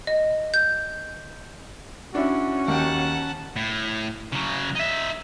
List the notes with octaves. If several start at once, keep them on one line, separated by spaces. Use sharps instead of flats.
D#5
G6
C#4 D4 E4 F#4
D#2 F#5 G5 A5
A2
C#3 F#3
D#4 E5